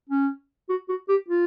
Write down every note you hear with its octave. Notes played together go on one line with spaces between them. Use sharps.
C#4
F#4
F#4
G4
F4